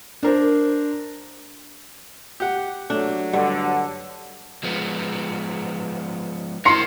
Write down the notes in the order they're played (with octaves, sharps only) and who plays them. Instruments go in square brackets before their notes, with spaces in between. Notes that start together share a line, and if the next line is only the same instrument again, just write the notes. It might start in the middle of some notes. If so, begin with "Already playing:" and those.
[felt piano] D4 A#4 C5
[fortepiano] G4 F#5
[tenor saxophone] F#3 [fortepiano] A3 [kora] D4
[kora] G2 [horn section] D3
[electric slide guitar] F3 G#3 B3
[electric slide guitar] A#4 C5 D#5 [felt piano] C6 C7 C#7